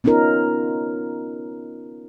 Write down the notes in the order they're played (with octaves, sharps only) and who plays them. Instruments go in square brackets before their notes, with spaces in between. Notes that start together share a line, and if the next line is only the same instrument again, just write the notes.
[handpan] B3 C#4 D#4 F4 A#4